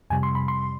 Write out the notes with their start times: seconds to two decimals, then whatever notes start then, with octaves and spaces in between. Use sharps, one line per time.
0.10 F2 C3 G3 G#5
0.23 C6
0.35 B5
0.48 C6